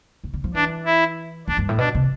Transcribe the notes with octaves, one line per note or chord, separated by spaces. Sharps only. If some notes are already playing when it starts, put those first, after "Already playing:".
D3
D3
F3
E3 D4
E4
F2 D4
G2
A2
B2 D4
C3